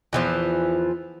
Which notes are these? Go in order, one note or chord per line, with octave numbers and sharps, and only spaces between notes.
E2 E3 F3